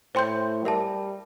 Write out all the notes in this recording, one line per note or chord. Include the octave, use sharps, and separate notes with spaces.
A2 C5 G5 C6 G6
G3 A#4 E5 A5